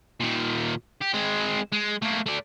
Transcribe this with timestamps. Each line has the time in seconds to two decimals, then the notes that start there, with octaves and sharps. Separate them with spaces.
0.20 A#2 D#3
1.02 G4
1.14 G#3 C4
1.72 G#3
2.02 A3 A#3
2.26 A3 D5